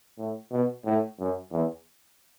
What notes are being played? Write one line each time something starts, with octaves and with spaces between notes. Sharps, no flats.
A2
B2
A2
F#2
E2